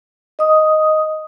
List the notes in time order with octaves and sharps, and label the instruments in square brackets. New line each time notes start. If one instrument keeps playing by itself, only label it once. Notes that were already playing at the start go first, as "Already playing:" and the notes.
[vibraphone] D#5 D#6